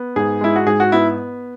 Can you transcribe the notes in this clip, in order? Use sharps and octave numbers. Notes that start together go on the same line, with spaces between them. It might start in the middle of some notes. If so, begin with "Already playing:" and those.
Already playing: B3
G#2 G#4
G#3 E4
F#4
G#2 G#4
F#4
B3 E4